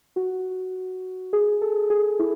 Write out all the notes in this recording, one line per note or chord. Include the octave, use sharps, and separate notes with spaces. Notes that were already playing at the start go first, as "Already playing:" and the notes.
F#4
G#4
A4
G#4
E4